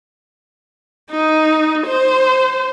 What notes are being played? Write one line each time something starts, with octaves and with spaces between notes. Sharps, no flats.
D#4
C5